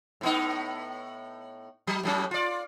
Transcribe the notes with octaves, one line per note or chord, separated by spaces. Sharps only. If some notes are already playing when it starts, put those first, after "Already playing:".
A2 B3 D#4
F#3
A2 F#3 C#4
F4 D5